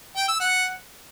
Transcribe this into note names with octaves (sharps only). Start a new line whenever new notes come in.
G5
E6
F#5